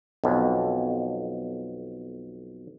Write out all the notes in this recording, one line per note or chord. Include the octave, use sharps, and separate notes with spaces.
B1 F2